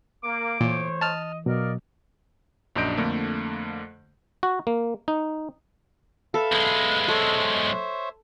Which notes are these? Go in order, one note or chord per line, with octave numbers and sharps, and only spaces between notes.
A#3 D6
A#2 E3 A3 C5 C#5
D#5 A5 F6
B2 F#3 A#4 D5 D#5 F5
A#1 F#2 D4 D#5 G6 D7
F2 D3 A3 A#3
F#4
A#3
D#4
A4 B4 E5 F5
B1 G#3
A4 C5 C#5 E5